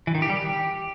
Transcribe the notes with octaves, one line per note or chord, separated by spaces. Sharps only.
E3
D#3
G4
G3
G4